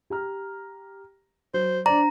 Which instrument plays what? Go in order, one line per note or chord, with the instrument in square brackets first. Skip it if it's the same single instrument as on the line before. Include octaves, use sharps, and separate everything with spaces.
[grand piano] G4 A#5 F6
[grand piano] F#3 [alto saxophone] C5
[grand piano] D4 C5 [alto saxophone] D5 [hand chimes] A#5